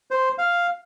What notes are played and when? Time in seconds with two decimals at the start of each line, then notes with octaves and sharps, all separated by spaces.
0.11 C5
0.38 F5